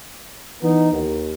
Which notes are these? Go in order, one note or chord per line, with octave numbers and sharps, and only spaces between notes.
E3 B3 D#4
D#2